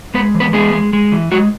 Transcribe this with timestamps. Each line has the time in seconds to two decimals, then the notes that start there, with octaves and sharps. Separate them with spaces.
0.14 G#3 B3 B4
0.35 E3
0.40 B3 B4
0.53 G#3 B3 G#4
0.73 G#3
0.93 G#3
1.12 E3
1.32 F#3 G#3 F#4